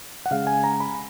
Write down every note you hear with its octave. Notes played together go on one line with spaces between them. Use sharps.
F#5
C#3 G#3 F5
G#5
A#5
B5